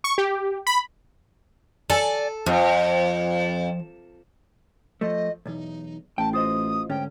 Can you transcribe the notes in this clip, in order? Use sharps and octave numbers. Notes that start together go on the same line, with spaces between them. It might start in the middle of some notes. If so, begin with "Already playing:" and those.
C#6
G4
B5
A4 D5 G#5
F2 F3
F3 A3 D#5
B1 E2 D#4
A1 G5 A5
F4 C5 D#5 D#6
D2 G#2 C#4 G5